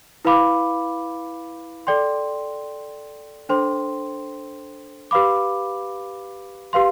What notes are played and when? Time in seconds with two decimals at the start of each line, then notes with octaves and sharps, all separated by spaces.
0.25 E4 B4 F5 B5 D6
1.87 A4 D5 G5 C6
3.49 D4 A4 C5 G5 C6
5.11 G4 B4 F5 B5 D6
6.73 G4 B4 F5 C6